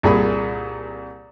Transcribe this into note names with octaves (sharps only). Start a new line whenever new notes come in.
C2 A#2 G#4 B5